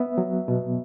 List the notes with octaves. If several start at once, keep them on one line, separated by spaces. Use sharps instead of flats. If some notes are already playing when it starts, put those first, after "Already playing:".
Already playing: B3 E5
F#3
B2